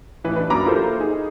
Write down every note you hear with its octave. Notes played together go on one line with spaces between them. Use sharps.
A1 E3 B4
D4 B4
F#2 A#3 A#5 B5 D6
E4 F4 G4 A4 A#4 C5
D#4 G#4